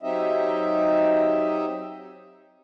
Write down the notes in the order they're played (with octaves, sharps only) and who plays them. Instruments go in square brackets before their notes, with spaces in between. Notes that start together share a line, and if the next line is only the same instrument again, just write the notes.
[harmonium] F#3 C4 D#4 G4 D#5 E5